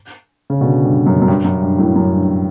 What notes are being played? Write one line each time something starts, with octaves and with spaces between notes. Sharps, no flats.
C#3
B2 D3
G2
F#2
F#2
G2
F#2
G2
F#2 A2
F#2
G2